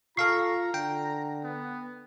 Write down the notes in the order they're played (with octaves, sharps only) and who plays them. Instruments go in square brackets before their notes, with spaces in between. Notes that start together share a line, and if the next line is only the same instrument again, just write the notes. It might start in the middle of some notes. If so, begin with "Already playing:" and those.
[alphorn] F4 [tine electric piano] A4 F5 C#6 [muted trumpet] A#5 [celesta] F6 C7
[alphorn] D3 [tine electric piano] G5
[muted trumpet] B3